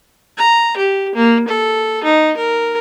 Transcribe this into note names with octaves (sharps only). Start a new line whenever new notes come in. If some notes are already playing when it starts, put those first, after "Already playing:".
A#5
G4
A#3
A4
D#4
A#4